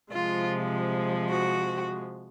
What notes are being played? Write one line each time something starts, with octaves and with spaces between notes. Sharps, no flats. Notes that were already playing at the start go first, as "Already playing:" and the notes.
C3 F3 G#3 F4
F#4